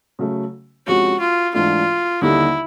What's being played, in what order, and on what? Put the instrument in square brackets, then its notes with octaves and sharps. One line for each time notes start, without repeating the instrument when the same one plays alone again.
[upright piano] C#3 F#3 A3
[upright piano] C3 F3 G#3 C#4 [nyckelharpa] F#4
[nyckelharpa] F4
[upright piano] G#2 E3 A3 D4 [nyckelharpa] F4
[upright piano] D#2 D3 G3 A#3 D#4 [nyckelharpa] E4